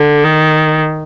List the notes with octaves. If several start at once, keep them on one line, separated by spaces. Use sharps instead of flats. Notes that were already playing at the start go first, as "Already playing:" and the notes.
Already playing: D3
D#3